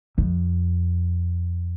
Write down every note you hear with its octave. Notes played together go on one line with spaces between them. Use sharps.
F2